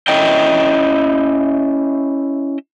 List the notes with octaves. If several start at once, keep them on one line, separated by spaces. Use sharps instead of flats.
C#4 E4 D#5 E5 G5